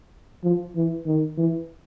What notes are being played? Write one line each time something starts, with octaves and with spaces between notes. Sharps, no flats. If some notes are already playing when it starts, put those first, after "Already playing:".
F3
E3
D#3
E3